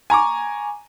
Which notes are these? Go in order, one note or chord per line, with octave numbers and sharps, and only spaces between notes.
G#5 A#5 C#6 D6